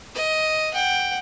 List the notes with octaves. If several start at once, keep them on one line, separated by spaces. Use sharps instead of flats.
D#5
F#5 G5